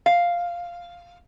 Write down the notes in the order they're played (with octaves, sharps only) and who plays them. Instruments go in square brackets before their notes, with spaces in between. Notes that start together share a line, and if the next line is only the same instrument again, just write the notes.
[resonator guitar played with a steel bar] F5